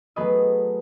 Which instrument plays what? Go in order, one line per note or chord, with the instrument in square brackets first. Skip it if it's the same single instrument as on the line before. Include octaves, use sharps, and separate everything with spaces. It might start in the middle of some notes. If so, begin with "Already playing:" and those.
[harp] F#3 A3 B3 G#4 B4 D#5